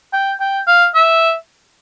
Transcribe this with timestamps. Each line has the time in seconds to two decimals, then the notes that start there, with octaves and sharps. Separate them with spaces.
0.13 G5
0.40 G5
0.67 F5
0.94 E5